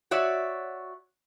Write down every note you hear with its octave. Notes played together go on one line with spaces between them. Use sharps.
F#4 C#5 D5 E5